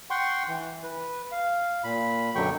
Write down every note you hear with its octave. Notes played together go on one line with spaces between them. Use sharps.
F#5 G5 C6 C#6
E3
B4
F5
A#2 B5
F#2 B2 D3 F#3 G5 C#6